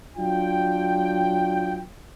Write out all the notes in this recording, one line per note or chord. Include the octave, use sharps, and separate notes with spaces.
F#3 D4 F4 G5